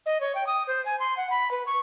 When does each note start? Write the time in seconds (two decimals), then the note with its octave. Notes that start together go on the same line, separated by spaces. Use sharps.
0.06 D#5
0.20 C#5
0.35 G5
0.47 D#6
0.67 C5
0.85 G#5
0.99 C6
1.17 F#5
1.31 B5
1.51 B4
1.66 C#6